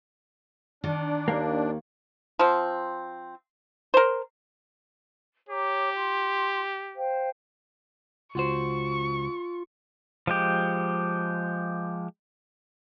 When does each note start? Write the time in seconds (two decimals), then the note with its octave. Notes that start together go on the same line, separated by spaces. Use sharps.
0.84 D#3 D4
1.28 D#2 A#3
2.39 F3 C4
3.94 A#4 C5
5.49 G4 C#5 A#5 D6
5.95 F4 C6
6.96 C5 F5 G5
8.35 C#2 F4 F#4 C5 C#6
10.27 F3 G#3 G4